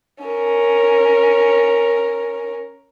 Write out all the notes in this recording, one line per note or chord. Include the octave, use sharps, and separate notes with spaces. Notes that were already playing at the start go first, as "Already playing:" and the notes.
C#4 A#4